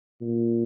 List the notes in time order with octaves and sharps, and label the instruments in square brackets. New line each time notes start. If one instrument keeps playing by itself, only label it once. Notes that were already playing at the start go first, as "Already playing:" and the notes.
[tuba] A#2